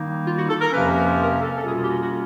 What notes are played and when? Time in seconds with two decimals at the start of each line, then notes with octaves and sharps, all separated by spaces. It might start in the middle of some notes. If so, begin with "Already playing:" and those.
Already playing: D#3 G3 A#3 D#4
0.26 F4
0.37 F#4
0.49 A4
0.61 A#4
0.72 F2 C3 F3 A#3 C#4 B4
1.19 A#4
1.42 A4
1.56 A4
1.65 B2 G3 A#3 C#4 F4 G#4
1.82 G4
1.88 F#4
2.00 F#4